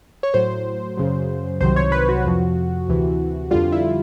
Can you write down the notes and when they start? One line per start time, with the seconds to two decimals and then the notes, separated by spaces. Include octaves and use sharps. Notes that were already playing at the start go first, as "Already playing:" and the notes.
0.23 C#5
0.34 A2 F#3 C5
0.97 F#2 C#3 F#3
1.61 C2 C3 D#3 F#3 C5
1.76 C#5
1.92 B4
2.09 F#4
2.25 F2 C3 F3
2.88 D2 C3 E3
3.51 F2 D3 G3 F4
3.72 E4